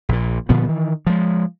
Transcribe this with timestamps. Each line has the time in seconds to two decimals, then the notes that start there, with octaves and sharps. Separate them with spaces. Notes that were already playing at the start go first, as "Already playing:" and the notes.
0.09 A#1 A#2
0.49 A#2 D3 F3 B3
0.65 D#3 E3
1.07 F3 G#3